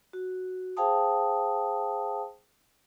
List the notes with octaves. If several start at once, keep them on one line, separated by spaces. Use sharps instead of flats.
F#4
G#4 C5 F5 G5 A5 D#6